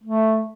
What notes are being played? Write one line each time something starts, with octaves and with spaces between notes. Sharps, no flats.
A3